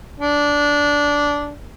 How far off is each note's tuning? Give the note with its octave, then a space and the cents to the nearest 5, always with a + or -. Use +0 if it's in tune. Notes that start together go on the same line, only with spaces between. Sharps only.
D4 -15